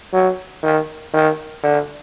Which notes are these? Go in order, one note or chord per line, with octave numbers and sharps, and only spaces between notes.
F#3
D#3
D#3
D3